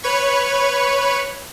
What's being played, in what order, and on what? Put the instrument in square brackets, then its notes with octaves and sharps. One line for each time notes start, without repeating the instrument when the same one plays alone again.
[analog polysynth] B4 C#5 B5 C#6